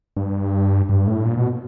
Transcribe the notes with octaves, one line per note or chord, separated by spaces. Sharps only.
G2
G2
A2
A#2
B2